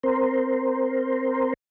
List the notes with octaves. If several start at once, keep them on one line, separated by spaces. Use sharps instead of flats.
C4 A#4 C5